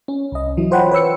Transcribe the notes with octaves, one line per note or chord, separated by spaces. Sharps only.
C#4
C2 D#5
E3 F#3 E4
F4 C5 C#5 F#5 G5 B5
B4 C#5 E6 C#7